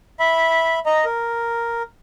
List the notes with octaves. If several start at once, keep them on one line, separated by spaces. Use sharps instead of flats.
E5 B5
D#5 A#5
A#4